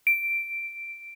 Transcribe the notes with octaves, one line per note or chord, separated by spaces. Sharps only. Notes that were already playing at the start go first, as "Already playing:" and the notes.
D7